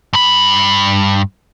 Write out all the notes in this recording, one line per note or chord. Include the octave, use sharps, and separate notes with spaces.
G2 B5